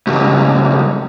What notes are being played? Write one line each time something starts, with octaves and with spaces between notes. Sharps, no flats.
C#2 G2